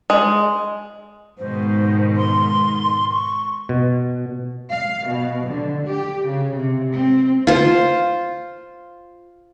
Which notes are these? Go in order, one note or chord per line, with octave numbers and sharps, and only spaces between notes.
G#3
G#2 B2 D#3 C5
C6
C#6
B2
F5
B2
D3
G4
C#3
C3
C4
F4 C5